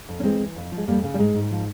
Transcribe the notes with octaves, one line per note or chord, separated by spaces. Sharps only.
F2
C#4
E3 G#3 C4
E3
F2
F3
G#3
F2 G3 A#3
C#3
G3
G#2 G#3
G#2
F3